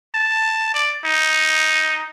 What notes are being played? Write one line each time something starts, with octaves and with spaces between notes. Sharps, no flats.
A5
D5
D#4